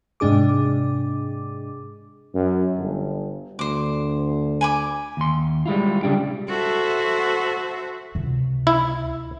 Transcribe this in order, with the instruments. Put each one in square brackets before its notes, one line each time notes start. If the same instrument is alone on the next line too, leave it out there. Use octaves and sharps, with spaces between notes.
[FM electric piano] G#2 C3 D4 G#4 D6
[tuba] F#2
G1
[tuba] D2 [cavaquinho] C5 D6
[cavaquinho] G#5 B5 D6
[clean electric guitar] D#2 C6
G3 G#3 E4 F4
C#3 G3 D4 G4
[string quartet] F#4 A4 C5 E5
[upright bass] C#2 C3
[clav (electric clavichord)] E4